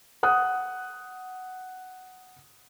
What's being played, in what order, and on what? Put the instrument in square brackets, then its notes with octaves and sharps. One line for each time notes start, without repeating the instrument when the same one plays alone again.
[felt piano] F#5 D#6 F#6